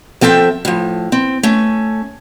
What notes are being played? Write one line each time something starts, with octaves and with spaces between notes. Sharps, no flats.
F3 C4 A4 E5 G5
A2 F3
C4
A3 C#4